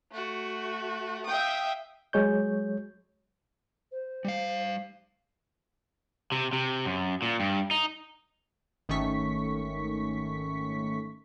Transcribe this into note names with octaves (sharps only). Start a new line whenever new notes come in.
A3 F#4
E5 F5 G5 D#6
F#3 G#3 C#5 G6
C5
G3 F5
C3
C3
F#2
A#2
G2
D#4
G#1 D#3 A3 C#4 C#6 B6